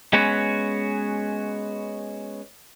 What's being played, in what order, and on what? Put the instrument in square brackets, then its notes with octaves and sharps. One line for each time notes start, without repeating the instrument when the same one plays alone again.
[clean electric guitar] G#3 B3 C#4 F#4 B4 C#5